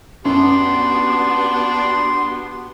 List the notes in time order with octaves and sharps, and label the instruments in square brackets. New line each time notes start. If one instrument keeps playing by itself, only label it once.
[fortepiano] F#2 [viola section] B3 F#4 G4 [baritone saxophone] D4 [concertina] C6